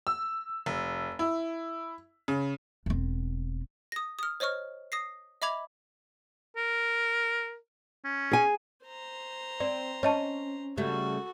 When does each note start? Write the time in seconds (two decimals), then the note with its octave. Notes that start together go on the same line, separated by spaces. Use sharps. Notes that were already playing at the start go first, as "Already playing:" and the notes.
0.07 E6
0.66 F1
1.19 E4
2.28 C#3
2.86 E1 C4
3.92 D#6 A#6
4.19 D#6 F6
4.40 C5 C#5 D#5 C#6 F6
4.92 D#6 A#6 C7
5.42 D#5 E5 B5 D6 G#6 F7
6.57 A#4
8.05 C#4
8.31 G#4 G#5
8.85 C5 A#5
9.60 C4 D5
10.03 C#4 C#5 D#5 A5
10.77 C#3 G3 A3 F#4 A4